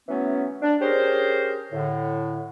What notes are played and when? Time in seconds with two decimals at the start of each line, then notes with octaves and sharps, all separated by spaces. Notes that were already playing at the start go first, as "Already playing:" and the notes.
0.09 E3 F#3 A3 B3 C#4
0.62 D4
0.81 C#4 G4 G#4 A#4 C5
1.73 A2 D3